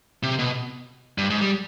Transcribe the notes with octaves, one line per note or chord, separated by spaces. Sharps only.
C3
B2
G2
G#2
G3